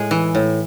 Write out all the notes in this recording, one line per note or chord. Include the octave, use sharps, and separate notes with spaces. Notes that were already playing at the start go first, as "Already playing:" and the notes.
Already playing: A2 G#3 G#4
E3
A2